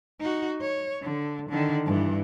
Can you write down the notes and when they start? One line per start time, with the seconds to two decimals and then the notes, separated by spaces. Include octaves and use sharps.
0.20 D#4 F#4
0.61 C#5
1.03 D3
1.50 D3 D#3
1.86 G2 E3